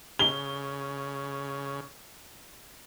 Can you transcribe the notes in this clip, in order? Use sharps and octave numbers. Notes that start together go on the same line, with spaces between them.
C#3 G7